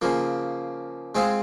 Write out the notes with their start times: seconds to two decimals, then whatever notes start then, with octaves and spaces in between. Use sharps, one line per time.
0.02 C#3 F3 A#3
1.15 G#3 C4 F4 G#4